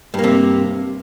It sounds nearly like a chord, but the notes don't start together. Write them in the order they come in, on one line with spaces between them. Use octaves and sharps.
G2 A#3 C3